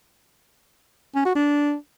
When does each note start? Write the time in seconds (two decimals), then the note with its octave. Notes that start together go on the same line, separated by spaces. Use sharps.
1.15 C#4
1.25 F#4
1.35 D4